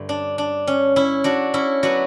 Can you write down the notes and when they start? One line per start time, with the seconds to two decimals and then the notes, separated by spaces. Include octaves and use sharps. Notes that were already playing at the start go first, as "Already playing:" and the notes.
Already playing: G2 D3 A3
0.09 D4
0.38 D4
0.67 C#4
0.96 C#4 E4
1.24 D4 F#4
1.54 C#4 E4
1.83 F#3 B3 D4 F#4